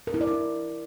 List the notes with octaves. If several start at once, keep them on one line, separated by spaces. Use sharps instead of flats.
A#4
E4
D5
E4